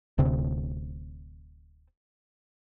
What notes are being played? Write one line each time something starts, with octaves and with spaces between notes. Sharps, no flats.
D1 D2 C3 C4